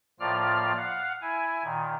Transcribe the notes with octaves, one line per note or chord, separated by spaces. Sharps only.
A2 F3 A#3 F4 D5 F6
F5 F#5
E4 G#5
A#2 D#3